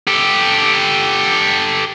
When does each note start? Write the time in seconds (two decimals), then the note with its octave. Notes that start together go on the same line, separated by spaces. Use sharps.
0.08 G4 A4